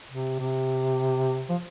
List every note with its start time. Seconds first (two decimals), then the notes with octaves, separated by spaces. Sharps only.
0.11 C3
0.39 C3
1.49 F3